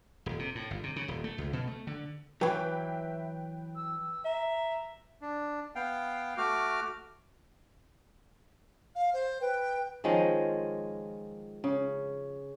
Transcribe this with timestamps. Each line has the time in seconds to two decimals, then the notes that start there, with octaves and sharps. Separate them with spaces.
0.26 D#1
0.39 C3
0.55 A2
0.71 G1
0.83 C3
0.96 C#3
1.08 D#1
1.24 A3
1.38 C#2
1.53 B2
1.67 A3
1.87 D3
2.41 E3 F#3 B4 E5 G5
3.76 E6
4.25 E5 A#5
5.21 D4
5.75 B3 F5 G5
6.37 A3 F#4 D6 F6
8.95 F5
9.13 C5
9.41 B4 G5
10.04 D#3 F3 G#3 C#4
11.64 C#3